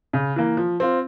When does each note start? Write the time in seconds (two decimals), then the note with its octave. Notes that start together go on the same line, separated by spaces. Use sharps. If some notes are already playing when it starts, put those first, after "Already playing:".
0.13 C#3
0.36 E3 A#3
0.57 F3
0.80 C4 F4